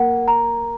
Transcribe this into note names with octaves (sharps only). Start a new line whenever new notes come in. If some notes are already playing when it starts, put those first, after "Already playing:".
Already playing: A#3 F#5
A#5